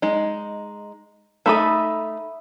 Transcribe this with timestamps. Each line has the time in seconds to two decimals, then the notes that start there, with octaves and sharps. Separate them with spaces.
0.02 G#3 D#4
1.46 A3 D#4 A4 E5 B5 D#6